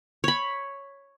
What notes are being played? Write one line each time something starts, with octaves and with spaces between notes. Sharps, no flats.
C#5 B5